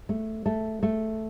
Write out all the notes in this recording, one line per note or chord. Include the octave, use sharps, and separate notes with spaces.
A3
A3
A3